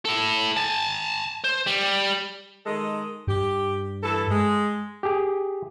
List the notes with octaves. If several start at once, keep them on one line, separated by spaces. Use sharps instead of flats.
E4 A4
G#5 A5
C5
G3
D#3 G#3 A4
G2 G4
E3 A4
G#3
G4 G#4